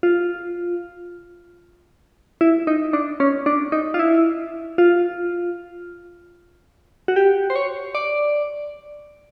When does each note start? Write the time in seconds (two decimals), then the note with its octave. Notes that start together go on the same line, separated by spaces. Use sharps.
0.03 F4
2.41 E4
2.67 D#4
2.93 D4
3.20 C#4
3.46 D4
3.72 D#4
3.94 F4
3.99 E4
4.78 F4
7.08 F#4
7.16 G4
7.50 C5
7.56 C#5
7.95 D5